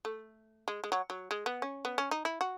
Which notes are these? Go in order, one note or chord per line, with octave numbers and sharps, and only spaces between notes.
A3
G#3
G#3
F#3
F#3
G#3
B3
C#4
B3
C#4
D#4
E4
F#4